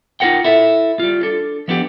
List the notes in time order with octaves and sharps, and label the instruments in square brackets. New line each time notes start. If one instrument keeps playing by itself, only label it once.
[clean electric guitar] D#4 F4 F#4 A#4 F#5 G5
E4 A4 E5
G3 F4
D4 A4
F3 B3 D4 G4